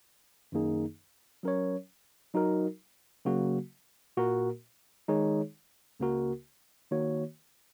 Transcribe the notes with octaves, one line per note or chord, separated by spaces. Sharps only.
F#2 D#3 A#3 D#4 G#4
F#3 C#4 A#4 C#5
F#3 D#4 F#4 A#4
C#3 F#3 A#3 F#4
A#2 A#3 F#4 A#4
D#3 G#3 D#4 G#4 C#5
C#2 C#3 A#3 F#4 A#4
D#3 A#3 F#4 C#5